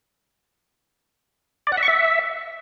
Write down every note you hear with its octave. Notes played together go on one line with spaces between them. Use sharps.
D5
F#5
E5
C#6
E5